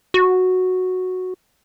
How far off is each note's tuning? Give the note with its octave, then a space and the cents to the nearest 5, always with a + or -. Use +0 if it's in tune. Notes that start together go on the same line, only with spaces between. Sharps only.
F#4 -5